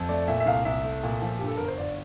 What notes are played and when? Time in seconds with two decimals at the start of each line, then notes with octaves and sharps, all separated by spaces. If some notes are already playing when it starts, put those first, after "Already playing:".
Already playing: F2
0.09 A3 D5
0.28 A#2 E5
0.40 E5
0.46 C2 F5
0.65 C2 E5
0.84 A3
1.04 A#2
1.22 F3
1.38 G2 G4
1.48 A4
1.57 G1 A#4
1.68 C5
1.78 G1 D5